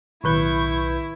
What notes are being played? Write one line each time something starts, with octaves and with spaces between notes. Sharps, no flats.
B1 A2 D#3 E4 B4 C#6 G6